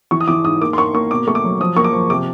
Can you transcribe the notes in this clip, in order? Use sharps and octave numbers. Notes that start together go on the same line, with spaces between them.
E3 C#6
D#6
E3 D6
G#2 D#6
A#3 D6
C6
A#3 C#6
A#3 C#6
B2 D6
A3 C#6
D6
F#3
F3 D#6
A#3 C#6
D6
F3
C3 D6